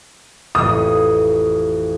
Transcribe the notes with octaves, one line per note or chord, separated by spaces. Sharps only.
A1 F2 D#6